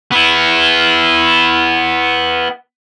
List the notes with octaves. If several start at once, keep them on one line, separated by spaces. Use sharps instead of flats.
B3 E4